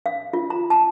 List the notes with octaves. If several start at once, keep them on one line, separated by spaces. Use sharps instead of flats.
F5
F4
A#5
A5